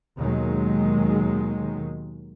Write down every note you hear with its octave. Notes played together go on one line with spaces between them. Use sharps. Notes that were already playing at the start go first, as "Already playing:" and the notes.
D#2 B2 D#3 F#3 G#3